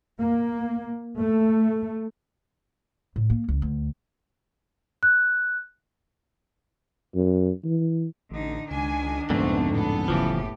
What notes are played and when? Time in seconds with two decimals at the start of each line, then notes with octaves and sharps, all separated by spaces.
0.19 A#3
1.19 A3
3.16 A2
3.30 A#3
3.48 C#2
3.62 D2
5.03 F#6
7.15 F#2
7.64 E3
8.31 A1 D3 D#4
8.71 C#2 D#3 D4 G#5
9.30 C2 F2 G#2 D3 A3 B3 C4
9.73 C#2 A2 B3 A4
10.08 F#1 A2 C#3 E3 F3 G4